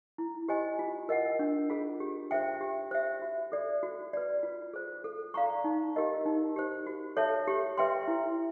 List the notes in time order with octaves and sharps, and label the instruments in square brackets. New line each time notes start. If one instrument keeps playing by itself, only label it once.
[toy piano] E4
G4 C5 D#5 G#5
F4
A#4 D#5 F#5
D4
F4 G#4
G4
C5 E5 G5
G4
C5 E5
F#4
A4 D5
F#4
B4 D5
F4
G#4 C5
A4
D5 F5 A#5 C#6
D#4
G4 A#4 D#5
D#4
G4 C5
F#4
A4 C#5 E5 A5
G4
B4 E5 G5 C6
E4